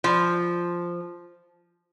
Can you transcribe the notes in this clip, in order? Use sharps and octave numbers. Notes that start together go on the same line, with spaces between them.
F3